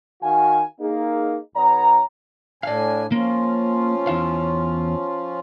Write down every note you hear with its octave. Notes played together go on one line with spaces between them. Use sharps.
D#3 F#4 F5 G#5
A#3 D#4 G#4
B1 B3 C#5 A#5
A2 D4 D5 F5 G#5
F3 A#3 C#4 F4
E2 E4 F5